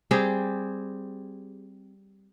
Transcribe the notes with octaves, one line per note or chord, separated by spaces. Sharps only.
G3 C4 G4 G#4